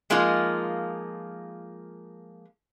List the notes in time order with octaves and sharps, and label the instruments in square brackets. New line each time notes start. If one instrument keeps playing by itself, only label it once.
[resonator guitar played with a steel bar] F3 G#3 A#3 D#4 F4